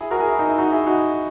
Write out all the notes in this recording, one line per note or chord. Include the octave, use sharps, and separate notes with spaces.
E4 G#4
F#4 A#4
E4 G#4
E4
D#4
E4
D#4 F#4
E4 G#4
D#4 F#4